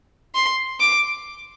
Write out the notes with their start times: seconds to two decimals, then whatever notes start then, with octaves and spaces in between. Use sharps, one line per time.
0.35 C6
0.80 D6